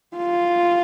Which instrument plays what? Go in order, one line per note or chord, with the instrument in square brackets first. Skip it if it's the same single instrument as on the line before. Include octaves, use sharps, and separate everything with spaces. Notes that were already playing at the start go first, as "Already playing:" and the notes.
[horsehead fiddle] F4